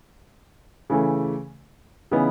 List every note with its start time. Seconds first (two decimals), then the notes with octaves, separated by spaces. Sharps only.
0.90 C#3 E3 A3
2.11 C#3 E3 B3 D#4